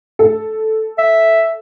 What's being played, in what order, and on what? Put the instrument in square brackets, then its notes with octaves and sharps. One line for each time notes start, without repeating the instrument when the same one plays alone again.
[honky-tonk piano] A4
[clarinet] E5